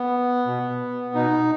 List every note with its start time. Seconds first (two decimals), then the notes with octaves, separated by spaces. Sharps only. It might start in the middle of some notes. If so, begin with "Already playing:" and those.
Already playing: B3
0.47 B2
1.14 B2 D#4